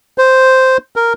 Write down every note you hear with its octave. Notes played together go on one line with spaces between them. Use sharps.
C5
A#4